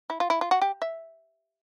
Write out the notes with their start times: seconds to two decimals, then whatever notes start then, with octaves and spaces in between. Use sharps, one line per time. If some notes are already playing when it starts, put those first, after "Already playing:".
0.10 E4
0.20 F4
0.30 E4
0.41 F4
0.51 F#4
0.62 G4
0.82 E5